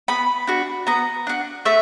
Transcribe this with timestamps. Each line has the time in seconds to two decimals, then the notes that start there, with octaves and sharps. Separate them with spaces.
0.08 B3 B5
0.47 D4 F#4
0.87 B3 A#5
1.27 D4 F#4
1.65 A3 E5